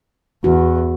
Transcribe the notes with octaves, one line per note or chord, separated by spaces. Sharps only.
E2 F#4